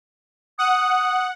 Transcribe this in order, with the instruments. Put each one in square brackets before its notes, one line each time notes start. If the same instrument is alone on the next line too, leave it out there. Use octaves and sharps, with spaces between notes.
[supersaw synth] F#5 [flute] D#6